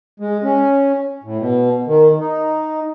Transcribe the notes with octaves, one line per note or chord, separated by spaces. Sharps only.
G#3
C#4
A2
B2
D#3
D#4